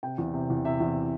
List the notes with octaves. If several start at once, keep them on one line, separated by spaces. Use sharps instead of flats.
C3 G5
E2
C3
E2
C3 E5
E2